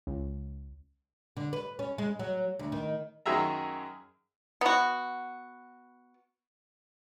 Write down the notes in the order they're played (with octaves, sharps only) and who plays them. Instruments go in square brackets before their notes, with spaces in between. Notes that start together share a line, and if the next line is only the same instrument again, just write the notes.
[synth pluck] C#2
[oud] D3
B4
C#4
G#3
F#3
D2
D#3
[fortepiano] F#2 D#3 F#3 G#4 E5 A#5
[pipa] B3 F#4